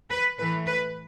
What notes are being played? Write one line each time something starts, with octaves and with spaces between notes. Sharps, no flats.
B4
A2 E3 A3 B4
B4